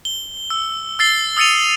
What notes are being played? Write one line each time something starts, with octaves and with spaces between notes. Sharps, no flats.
G7
E6
E6 A6 C7 G7
D#6 E6 A6 C#7 D#7 F7